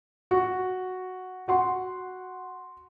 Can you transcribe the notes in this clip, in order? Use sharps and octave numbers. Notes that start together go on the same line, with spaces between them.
F#4
F#4 F#5 C6